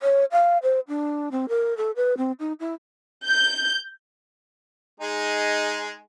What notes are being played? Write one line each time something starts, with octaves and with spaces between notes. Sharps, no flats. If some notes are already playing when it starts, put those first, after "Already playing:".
C#5
F5
C5
D4
C4
A#4
A4
B4
C4
D#4
E4
G6
G#3 D#4 G#4